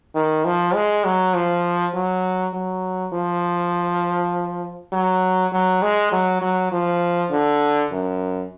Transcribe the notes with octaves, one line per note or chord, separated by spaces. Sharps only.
D#3
F3
G#3
F#3
F3
F#3
F#3
F3
F#3
F#3
G#3
F#3
F#3
F3
D3
F#2